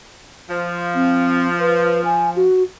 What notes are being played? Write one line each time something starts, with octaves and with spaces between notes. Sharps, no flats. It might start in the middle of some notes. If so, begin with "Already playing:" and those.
F3
C4
B4
G#5
F#4